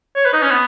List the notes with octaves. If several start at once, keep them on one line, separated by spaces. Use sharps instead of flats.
C#5
B4
D#4
C#4
B3